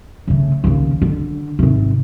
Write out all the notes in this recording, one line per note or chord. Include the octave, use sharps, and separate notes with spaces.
C#3 A3
D#2 C#3
D3
G#1 C3